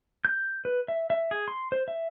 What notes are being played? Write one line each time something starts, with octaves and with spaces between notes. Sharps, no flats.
G6
B4
E5
E5
G#4
C6
C5
E5